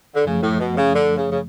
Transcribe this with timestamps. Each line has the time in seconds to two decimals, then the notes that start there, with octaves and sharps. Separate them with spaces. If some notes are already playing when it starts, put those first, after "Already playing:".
0.15 D3
0.25 F#2 C#3 F3 A3
0.42 A2
0.60 B2
0.77 C#3
0.94 D3
1.17 C#3
1.31 C#3